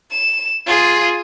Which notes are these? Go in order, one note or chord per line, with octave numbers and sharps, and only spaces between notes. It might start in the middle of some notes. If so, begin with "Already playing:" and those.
E7
F4 G#4